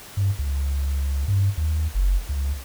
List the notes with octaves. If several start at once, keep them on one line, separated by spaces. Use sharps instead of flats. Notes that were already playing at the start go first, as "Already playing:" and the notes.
G2
C#2
G2
D#2
F#1
C#2